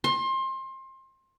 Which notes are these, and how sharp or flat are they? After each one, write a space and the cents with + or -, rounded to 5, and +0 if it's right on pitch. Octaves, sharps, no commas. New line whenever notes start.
C6 +25